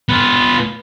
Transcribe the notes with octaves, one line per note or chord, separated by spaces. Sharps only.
B3 F4